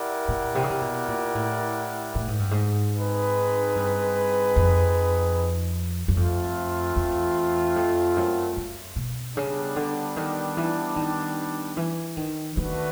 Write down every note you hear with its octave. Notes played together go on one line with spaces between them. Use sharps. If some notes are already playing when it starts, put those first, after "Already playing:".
Already playing: E4 G4 A#4 D5 F#5
A#2
C3
C#3
C3
B2
A#2
A2
A2
G#2
G2
G#2
C4 D#4 G#4 B4
G2
F2
F#2
F2 A3 C4 F4
E2
F2
F#2
F#2
B2
C#3 G3 B3 D4
D3
D#3
E3
D#3
E3
D#3
D#3 A3 D4 F#4 B4